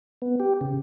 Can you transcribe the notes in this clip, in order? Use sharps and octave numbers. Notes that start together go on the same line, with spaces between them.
B3
G4
C#3